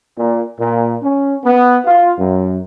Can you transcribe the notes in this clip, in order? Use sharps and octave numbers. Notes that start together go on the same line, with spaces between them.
A#2
A#2
C#4
B3
F4
F#2